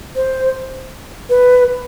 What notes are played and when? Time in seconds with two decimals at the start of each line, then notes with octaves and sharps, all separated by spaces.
0.16 C5
1.29 B4